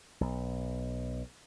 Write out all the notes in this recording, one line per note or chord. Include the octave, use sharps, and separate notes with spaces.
B1